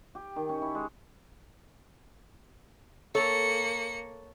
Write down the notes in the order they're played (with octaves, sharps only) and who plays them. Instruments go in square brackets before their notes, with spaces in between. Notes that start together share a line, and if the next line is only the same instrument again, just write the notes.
[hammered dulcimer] G4
D#3
C#4
E4
G#3
[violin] A#3 C#7 [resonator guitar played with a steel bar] A4 C#5